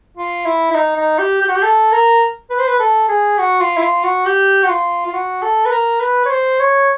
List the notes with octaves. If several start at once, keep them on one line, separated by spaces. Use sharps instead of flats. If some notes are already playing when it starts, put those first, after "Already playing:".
F4
E4
E4
D#4
D#4
G4
G4
F#4
G4
A4
A#4
B4
C5
B4
A4
G#4
F#4
F4
E4
F4
F#4
G4
F#4
F4
F4
F#4
A4
B4
A#4
B4
C#5
C5
C#5